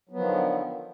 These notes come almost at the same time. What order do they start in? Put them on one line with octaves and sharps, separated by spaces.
F#3 B3 F3 D#3 D3